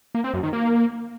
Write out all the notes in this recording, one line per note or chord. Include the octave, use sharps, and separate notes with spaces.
A#3
C4
F#2
D#3
A#3